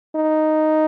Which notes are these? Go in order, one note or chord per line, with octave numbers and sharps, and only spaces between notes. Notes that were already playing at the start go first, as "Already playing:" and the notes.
D#4